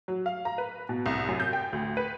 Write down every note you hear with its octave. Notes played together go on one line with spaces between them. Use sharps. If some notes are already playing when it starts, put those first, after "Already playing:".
F#3
F5
A#5
B4
B2
C2
F#2
G6
G5
D2
B4